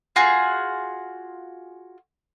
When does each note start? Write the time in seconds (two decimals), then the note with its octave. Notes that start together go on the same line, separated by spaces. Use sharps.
0.16 F4 F#4 G#4